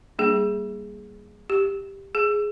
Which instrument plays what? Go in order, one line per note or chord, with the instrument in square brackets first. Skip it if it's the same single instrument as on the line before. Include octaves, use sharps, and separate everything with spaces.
[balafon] G3 A#3 D4 G#4
G4
G#4